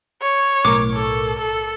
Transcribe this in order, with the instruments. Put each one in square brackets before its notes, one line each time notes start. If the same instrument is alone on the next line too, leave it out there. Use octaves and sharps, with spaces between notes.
[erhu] C#5
[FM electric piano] B1 A2 A#4 [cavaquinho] D6
[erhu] A4
A4